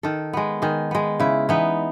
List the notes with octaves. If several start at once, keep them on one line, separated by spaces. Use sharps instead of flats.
D#3 A4
G#3 B3
D#3 G#4
G#3 B3
C#3 E4
E3 B3 D#4